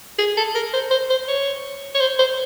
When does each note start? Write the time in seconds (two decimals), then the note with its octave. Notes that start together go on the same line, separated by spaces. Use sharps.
0.18 G#4
0.37 A4
0.55 A#4
0.73 C5
0.91 C5
1.10 C5
1.28 C#5
1.95 C#5
2.00 C5
2.19 C5